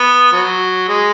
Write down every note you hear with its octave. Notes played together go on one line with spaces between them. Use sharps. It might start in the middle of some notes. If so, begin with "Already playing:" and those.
Already playing: B3
F#3
G#3